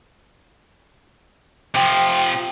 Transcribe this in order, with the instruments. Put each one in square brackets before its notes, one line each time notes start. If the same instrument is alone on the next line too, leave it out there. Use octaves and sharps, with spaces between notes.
[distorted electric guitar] C3 F3 [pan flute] G5